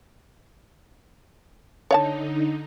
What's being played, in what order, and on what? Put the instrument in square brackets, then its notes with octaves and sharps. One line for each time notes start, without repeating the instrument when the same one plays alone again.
[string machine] D3 D#4 [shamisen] C#5 F5 A5